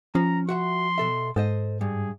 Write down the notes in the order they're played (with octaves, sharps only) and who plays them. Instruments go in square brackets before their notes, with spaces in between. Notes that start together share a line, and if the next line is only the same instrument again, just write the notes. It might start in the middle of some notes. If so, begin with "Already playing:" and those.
[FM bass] F3 [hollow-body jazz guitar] C#4 [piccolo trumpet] A#5
[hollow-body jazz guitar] F#4 E5 F#5 [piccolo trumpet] C6
[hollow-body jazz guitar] B2 A4 E5
[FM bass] G#2 [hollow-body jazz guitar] A4 C5 D#5
[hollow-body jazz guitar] G2 [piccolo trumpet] G#4